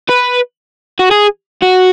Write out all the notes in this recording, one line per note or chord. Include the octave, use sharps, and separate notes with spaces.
B4
F#4
G#4
F#4